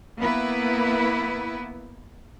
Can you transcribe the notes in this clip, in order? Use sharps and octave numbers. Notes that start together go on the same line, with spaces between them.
A#3 B3 E4 B4